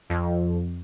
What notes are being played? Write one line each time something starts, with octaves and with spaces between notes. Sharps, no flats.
F2